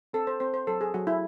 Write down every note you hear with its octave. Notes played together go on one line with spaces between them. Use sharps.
C4 A4
C5
C4 C5
C5
F#3 A4
G#4
F#3 F#4
E4